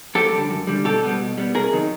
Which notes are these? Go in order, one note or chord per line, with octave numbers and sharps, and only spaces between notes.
F#2 G4 A4
D3 G3
F#2
D3 G3
B2 G4 A4
G3 B3
B2
G3 B3
C3 G#4 A#4
D#3 F#3